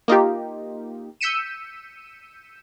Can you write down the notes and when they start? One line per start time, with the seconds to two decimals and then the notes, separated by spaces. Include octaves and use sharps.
0.08 A#3 D#4 F4 G4
1.21 E6 G6 B6 C#7 D#7 E7